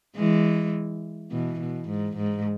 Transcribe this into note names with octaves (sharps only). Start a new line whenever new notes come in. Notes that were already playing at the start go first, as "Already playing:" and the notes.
E3 G#3
B2 E3
B2
G#2
G#2